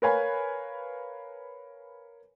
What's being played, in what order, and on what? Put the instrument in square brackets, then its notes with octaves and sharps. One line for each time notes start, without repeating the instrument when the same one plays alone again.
[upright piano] A#4 B4 C#5 F5 G#5 B5